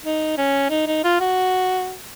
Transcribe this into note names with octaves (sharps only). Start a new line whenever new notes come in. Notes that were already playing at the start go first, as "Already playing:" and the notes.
D#4
C#4
D#4
D#4
F4
F#4